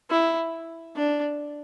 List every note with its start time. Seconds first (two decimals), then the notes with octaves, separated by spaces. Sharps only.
0.11 E4
0.96 D4